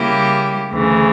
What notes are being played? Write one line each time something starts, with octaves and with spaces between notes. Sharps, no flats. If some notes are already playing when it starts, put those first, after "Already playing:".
Already playing: C#3 G3 A#3 E4 G4
D2 C#3 E3